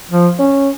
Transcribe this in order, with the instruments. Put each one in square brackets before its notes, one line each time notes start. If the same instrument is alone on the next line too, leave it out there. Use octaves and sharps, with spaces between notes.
[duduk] F3
[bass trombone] C#4